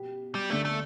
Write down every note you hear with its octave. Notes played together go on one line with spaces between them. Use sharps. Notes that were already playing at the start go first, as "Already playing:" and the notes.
Already playing: B2 B3 G4
G3
D2 D3 A3 B3 D4
A3